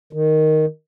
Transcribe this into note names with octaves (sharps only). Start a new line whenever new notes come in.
D#3